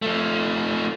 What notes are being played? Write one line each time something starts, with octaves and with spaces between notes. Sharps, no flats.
F3 A3